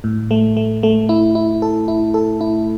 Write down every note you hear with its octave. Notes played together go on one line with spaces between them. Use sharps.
A2
A3
A3
A3
E4
E4
A4
E4
A4
E4